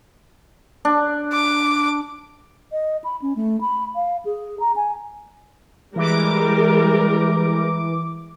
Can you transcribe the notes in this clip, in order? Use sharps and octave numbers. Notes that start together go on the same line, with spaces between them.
D4
D6
D#5
B5
C#4
A3
B5
F5
G#4
A#5
G#5
E3 G3 G#3 A#4 D6